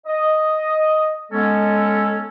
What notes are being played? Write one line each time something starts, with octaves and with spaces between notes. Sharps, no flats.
D#5
G#3 B3 C#4 A4